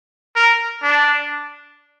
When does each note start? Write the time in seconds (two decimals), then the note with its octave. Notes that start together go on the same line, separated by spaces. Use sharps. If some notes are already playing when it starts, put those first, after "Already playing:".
0.36 A#4
0.83 D4